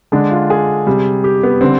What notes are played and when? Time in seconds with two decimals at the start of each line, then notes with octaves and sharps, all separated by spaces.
0.12 D3 G#3 D4
0.31 F4
0.50 G#4
0.87 C3 G3
1.24 G4
1.43 B3
1.61 D3 G3 C4